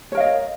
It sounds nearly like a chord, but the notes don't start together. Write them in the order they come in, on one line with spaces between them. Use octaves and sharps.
C#5 A#4 F5 D#5